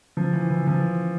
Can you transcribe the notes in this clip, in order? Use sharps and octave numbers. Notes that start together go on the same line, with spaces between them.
F3
E3
E3
F3